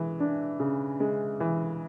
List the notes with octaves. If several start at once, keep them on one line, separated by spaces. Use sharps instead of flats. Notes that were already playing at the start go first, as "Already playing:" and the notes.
Already playing: E3 G#3
D4
C#3
G#3
E3